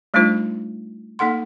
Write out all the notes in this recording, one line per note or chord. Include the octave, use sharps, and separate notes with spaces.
G3 A3 D4 D#4 F4 C5
A#3 D#4 A4 F#5 C6